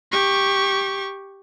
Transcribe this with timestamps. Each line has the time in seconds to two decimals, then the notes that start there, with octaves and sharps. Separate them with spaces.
0.12 G4 C#6